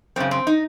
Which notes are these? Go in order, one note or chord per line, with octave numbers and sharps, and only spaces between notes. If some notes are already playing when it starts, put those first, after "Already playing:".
F#2 C#3 C4
C4
D#4